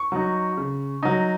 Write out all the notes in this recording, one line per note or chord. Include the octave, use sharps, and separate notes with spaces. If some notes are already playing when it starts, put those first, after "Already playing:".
Already playing: C#6
F#3 D#4
C#3
F#3 D#4